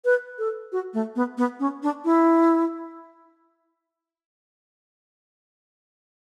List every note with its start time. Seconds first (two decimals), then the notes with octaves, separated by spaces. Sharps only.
0.05 B4
0.39 A4
0.72 F#4
0.94 A3
1.16 B3
1.38 B3
1.60 C#4
1.83 D4
2.05 E4